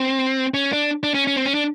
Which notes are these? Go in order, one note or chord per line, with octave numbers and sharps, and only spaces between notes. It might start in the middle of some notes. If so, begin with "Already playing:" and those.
Already playing: C4
C#4
D4
D4
C#4
C#4
C4
C#4
D4